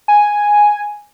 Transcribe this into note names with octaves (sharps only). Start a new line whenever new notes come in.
G#5